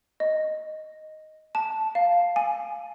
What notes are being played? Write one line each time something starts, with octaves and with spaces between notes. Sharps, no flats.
D#5
A5
F5
G#5